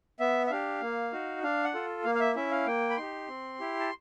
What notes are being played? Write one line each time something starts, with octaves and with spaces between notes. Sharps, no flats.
B3 E5
E5
D4 G4 F5
A#3
D#4 F#4
D4 F5
F#5
F4 A4
A#3 F5
F5
E5
C#4 E4 E5
F5
A#3 G5
B5
D#4 G4 C6
C4
E4 G4
A5